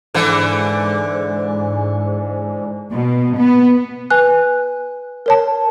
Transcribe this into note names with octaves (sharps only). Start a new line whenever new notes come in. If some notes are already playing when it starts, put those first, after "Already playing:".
G#2 D3 E3
B2
B3
B4 G#5 F#6
A#4 C#5 A5